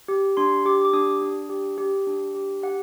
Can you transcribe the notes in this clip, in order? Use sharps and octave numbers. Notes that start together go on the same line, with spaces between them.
G4
D4 C6
G4 D6
D6
D4 D#6
D4
G4
G4
D4
G4
G4 F#5